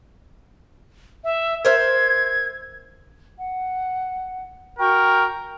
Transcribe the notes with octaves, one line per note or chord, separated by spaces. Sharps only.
E5
A#4 C5 E5 G#6
F#5
F#4 A#4 G5 C#6